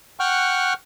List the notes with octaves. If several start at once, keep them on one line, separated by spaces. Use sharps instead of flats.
F#5 G5 C#6 F6 F#6